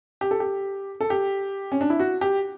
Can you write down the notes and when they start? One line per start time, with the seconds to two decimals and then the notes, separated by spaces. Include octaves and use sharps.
0.21 G4
0.31 A4
0.40 G4
1.01 A4
1.10 G4
1.72 C#4
1.81 D4
1.90 E4
1.99 F#4
2.21 G4